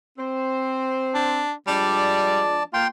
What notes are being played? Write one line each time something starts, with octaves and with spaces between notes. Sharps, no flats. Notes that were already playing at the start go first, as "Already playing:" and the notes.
C4 C5
D4
F3 G3 G#3 D4 D5 A5
A#3 F4 G5 C6